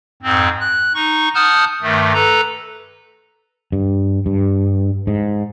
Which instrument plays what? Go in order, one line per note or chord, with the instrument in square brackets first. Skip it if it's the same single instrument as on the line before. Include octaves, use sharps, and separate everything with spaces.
[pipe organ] F2 G#2 C4
F#6
D#4 C#6
F#5 A5 D#6 F6 G6
G2 D#3 A3
A4 B4 A#5
[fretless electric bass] G2
G2
G#2